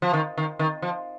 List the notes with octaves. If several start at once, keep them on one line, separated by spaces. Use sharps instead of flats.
F3
D#3
D#3
D#3
F3